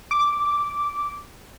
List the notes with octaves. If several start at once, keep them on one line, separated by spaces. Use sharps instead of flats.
D6